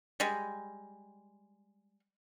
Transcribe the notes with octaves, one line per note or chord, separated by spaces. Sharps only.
G3 G#3